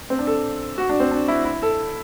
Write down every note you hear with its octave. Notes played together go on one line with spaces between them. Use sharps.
C4
D4
A4
F#4
D4
C4
D4
E4
E4
A4